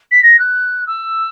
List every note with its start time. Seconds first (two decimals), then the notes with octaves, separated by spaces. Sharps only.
0.11 B6
0.23 A#6
0.39 F#6
0.87 E6